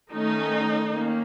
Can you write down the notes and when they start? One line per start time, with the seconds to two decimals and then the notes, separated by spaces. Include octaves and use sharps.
0.11 D#3 A3 C#4 D#4
0.91 D#3 A#3 C#4